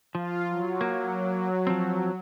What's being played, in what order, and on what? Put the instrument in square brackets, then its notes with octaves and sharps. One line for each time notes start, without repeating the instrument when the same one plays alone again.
[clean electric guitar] F3 [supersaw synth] F4
[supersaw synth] F#3
[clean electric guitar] A#3
F3 C4